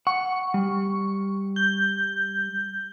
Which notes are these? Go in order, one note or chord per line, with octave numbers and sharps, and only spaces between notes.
F#5 C#6
G3
G6